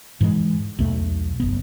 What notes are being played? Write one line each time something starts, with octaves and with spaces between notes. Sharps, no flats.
G#2 E3 G3 G#3
B1 E2 A3
F#1 B3